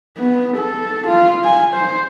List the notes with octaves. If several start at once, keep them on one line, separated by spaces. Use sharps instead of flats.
B3
A4
F4
G#5
C5